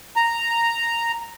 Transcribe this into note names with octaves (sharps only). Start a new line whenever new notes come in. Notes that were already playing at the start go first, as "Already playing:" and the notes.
A#5